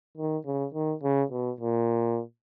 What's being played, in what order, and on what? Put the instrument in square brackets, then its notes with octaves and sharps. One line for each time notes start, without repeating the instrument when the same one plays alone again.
[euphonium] D#3
C#3
D#3
C#3
B2
A#2